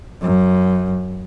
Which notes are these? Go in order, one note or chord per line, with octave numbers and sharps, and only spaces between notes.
F#2